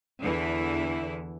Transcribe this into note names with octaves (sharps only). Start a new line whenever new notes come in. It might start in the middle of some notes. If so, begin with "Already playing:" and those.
E2 D3 E3 E4